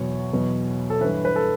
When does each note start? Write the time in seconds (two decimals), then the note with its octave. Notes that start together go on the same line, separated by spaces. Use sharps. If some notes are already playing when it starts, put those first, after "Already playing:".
Already playing: E2 B2 F#3 C#5
0.33 E2 B2 F#3
0.90 A4
1.01 G2 E3 B4
1.25 B4
1.36 A4